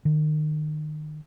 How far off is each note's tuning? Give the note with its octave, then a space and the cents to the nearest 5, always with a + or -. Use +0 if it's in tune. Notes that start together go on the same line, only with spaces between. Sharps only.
D#3 -30